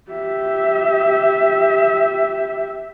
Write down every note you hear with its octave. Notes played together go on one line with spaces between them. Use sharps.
G4 E5